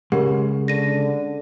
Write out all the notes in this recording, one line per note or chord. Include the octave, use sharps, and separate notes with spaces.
C#3 G#3 G4 A#4 F#5
D3 A#6 D#7